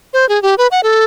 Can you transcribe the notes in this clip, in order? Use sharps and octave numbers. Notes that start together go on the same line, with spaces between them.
C5
G#4
G4
B4
F#5
A4